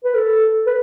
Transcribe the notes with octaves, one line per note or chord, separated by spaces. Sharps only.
B4
A4
B4